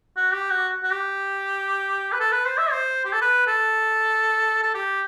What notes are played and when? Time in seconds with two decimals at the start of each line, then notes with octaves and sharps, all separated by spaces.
0.17 F#4
0.33 G4
0.50 F#4
0.83 F#4
0.92 G4
2.12 B4
2.20 A4
2.32 B4
2.46 C5
2.58 E5
2.71 C5
3.05 G4
3.13 A4
3.22 B4
3.47 A4
4.63 A4
4.75 G4